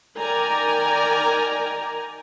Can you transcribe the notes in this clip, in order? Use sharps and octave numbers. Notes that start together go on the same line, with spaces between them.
D#3 A#4 D5 G5 G#5 A#5